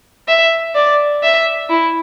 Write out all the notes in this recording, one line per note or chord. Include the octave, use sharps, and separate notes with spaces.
E5
D5
E5
E4